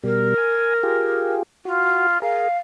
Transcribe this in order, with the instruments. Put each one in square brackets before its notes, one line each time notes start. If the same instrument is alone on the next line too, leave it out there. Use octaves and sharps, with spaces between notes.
[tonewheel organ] B2 G3 [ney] A#4
[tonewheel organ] G#5
F4 G4 G#4
[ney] F4 [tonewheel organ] F#4
[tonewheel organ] G#4 A#4 [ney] F5